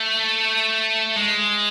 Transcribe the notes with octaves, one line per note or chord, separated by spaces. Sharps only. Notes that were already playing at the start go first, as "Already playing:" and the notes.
Already playing: A3
G#3